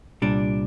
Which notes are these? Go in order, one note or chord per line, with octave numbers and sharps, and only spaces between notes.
C2 A#2 G3 D4